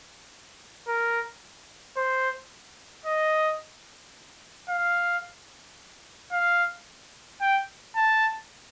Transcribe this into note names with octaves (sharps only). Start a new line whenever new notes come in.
A#4
C5
D#5
F5
F5
G5
A5